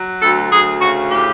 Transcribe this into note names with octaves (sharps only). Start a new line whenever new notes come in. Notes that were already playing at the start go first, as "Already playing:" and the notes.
Already playing: F#3
D2 A4
D2 G#4
C#3 F#4
A2 G4